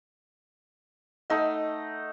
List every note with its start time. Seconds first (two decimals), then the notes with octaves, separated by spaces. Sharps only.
1.30 A3 D#4 F#5